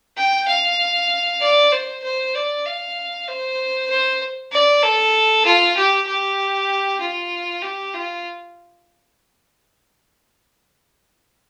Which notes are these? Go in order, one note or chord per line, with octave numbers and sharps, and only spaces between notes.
G5
F5
D5
C5
C5
D5
F5
C5
C5
D5
A4
F4
G4
G4
F4
G4
F4